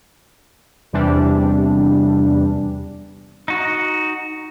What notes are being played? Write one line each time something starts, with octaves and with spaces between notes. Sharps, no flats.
E2 C3 E3 G3 D4
D#4 F#4